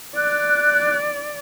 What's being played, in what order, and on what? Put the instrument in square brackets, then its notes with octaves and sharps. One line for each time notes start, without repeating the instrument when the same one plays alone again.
[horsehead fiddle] D5 [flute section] F#6